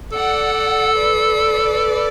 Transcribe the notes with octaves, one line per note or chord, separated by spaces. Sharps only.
A4 D5 F#5
B4 D5